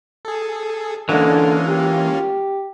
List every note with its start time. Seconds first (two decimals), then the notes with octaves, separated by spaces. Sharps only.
0.25 G#4 A4
1.09 D3 E3 G#3 A#3 C#4 F4
1.69 G4